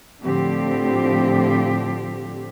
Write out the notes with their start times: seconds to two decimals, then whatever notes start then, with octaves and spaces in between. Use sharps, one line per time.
0.24 A2 D3 F3 C4 G4